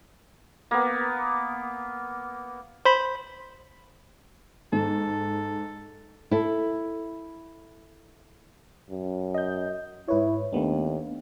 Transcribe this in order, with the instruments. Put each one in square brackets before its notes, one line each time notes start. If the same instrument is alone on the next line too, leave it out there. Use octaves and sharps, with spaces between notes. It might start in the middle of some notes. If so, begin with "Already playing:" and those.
[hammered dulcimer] A#3 B3
[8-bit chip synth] C5 B5
[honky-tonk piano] G#2 [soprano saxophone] A4
[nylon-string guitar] E4 A4
[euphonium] F#2
[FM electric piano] D#5 G6
[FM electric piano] G#2 B4 C#5 [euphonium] E4
[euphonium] D#2 [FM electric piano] A3 B3 D4